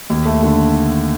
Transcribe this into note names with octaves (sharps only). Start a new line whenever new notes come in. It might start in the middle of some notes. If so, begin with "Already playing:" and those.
D#2
A3
D3